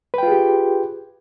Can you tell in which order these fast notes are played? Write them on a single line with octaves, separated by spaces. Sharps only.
B4 G5 F4 G#4 G4